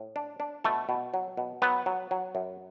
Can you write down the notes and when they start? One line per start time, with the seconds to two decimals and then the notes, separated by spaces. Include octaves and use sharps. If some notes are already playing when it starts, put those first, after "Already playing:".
Already playing: A2
0.16 D4
0.40 D4
0.64 B2 A3 A4
0.89 B2
1.14 F#3
1.37 B2
1.62 F#3 B3 B4
1.86 F#3
2.11 F#3
2.35 F#2